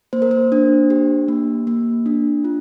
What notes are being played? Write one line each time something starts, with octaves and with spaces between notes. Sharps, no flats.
A#3 C5
A#4
C5
D4
G4
A#3
A#3
D4
F4